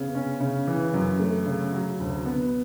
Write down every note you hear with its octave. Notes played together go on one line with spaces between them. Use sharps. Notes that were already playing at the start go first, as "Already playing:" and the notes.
Already playing: C#3 B3
C#4
C#3
E3
F#2
A3
C#3
F#3
D2
B3